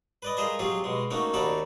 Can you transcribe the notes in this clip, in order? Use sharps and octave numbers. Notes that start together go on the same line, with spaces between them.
B4 D5 D#5
F4 G#4 A#4 C5 D#5 G#5
F#3 C4 F4 G4 G#4
B2 G#3
A3 A#3 C#4 D#4 F#4
D#2 D#4 F#4 A4 D5 B5